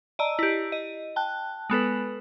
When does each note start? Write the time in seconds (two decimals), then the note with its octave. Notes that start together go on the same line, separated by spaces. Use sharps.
0.19 D5 D#5 A5 A#5 E6
0.39 E4 G4
0.72 D#5
1.16 G5 A5 F#6
1.70 G#3 B3 A4 B4